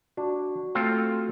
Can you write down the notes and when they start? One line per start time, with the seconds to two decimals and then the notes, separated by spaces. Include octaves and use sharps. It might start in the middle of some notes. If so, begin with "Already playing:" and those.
0.17 D4 F#4
0.75 A3 C4 F4 A4